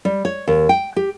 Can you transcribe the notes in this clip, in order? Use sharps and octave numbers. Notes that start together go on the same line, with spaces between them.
G3
C#5
D#2
G5
G4